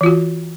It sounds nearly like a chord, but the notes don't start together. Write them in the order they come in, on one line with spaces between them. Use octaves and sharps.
E3 F4 F#4